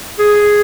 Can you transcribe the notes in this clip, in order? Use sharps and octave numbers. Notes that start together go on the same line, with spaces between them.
G#4